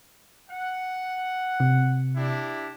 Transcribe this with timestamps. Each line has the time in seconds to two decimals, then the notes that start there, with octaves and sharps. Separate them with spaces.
0.50 F#5
1.60 C3
2.16 D4 E4 G4